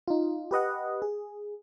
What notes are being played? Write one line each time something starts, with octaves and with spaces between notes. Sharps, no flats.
D#4 F4
G4 B4 D#5 F#5
G#4